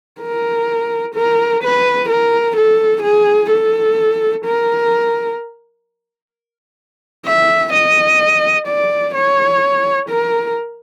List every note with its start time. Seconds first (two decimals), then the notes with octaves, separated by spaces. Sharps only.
0.21 A#4
1.15 A#4
1.63 B4
2.09 A#4
2.57 A4
3.03 G#4
3.51 A4
4.45 A#4
7.26 E5
7.73 D#5
8.67 D5
9.14 C#5
10.09 A#4